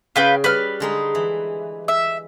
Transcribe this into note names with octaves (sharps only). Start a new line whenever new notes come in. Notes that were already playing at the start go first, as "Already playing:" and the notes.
C#3 F4 B4 G5
G3 B4 F6
D3 G#3 D#4
E3
E5